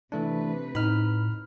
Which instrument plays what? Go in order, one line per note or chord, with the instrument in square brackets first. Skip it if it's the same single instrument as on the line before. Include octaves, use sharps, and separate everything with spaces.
[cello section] C3 B4 [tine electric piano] E3 A3 D4
[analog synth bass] A2 [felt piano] D#4 [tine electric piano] B5 F6